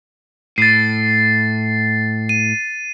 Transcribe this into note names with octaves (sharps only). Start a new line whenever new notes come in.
A2 A6 C7
D#7